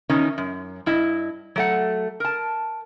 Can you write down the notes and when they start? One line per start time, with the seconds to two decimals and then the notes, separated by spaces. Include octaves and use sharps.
0.09 E2 D#3 C#4 D#4
0.38 F#2
0.86 G2 E4 D#5
1.56 F#3 A3 F#5
2.20 A#4 A5